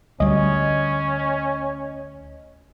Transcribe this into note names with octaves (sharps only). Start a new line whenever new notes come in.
D2 G3 C#4 D#5